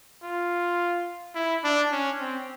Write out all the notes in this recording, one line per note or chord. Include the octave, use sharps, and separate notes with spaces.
F4
E4
D4
C#4
C4